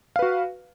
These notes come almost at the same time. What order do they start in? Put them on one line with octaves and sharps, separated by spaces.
F5 B4 F#4